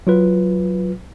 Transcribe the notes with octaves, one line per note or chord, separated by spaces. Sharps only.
F#3 F4 B4